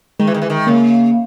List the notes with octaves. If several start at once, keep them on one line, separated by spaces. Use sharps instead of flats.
D#3 G#3
E3
D#3
E3
D#3
C#3 A#3